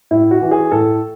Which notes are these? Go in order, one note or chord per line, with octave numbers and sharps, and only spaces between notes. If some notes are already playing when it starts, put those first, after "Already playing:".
A2 E4
F#4
E3
G#4
A2 A4